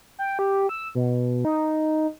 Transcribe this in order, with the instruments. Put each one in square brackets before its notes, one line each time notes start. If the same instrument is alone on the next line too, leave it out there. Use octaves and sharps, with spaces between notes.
[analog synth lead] G5
G4
E6
B2
D#4